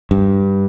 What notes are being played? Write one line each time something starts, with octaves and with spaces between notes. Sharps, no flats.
G2